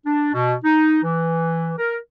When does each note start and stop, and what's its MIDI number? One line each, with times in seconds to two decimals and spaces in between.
0.06 0.33 62
0.34 0.54 47
0.64 0.99 63
1.04 1.72 52
1.78 1.96 70